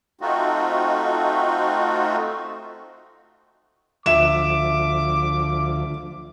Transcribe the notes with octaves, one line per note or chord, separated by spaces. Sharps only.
A3 C4 D#4 F4 F#4
D2 F3 E5 D6 E7